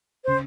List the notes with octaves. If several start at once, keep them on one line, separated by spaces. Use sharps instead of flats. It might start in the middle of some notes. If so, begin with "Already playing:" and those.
C#3 C5